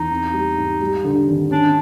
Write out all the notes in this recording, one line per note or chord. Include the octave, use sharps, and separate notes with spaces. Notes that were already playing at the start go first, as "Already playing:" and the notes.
Already playing: E2 D#4
C4
G3
G#2
G3
D3
G#1
C#4 D4